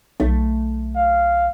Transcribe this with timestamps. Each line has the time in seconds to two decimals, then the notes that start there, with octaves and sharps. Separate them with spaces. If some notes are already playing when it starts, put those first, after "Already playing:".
0.20 B1 A3
0.96 F5